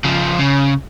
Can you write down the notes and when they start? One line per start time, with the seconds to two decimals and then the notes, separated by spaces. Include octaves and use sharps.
0.04 C#3 F3
0.38 C#3